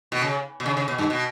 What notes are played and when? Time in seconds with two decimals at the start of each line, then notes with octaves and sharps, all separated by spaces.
0.12 B2
0.22 C#3
0.60 B2
0.66 C#3
0.77 C#3
0.88 B2
0.98 G2
1.10 B2